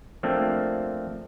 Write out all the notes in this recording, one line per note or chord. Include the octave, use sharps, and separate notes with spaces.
F3 A3 A#3 C4 D4